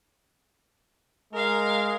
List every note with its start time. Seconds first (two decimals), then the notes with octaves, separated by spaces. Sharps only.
1.33 G#3 A#4 F5